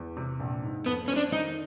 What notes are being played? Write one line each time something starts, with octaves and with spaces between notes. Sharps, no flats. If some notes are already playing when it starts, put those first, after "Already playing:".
Already playing: E2
C3
A#1
G#2
F2 B3
C4 C#4
D4
D#3 D#4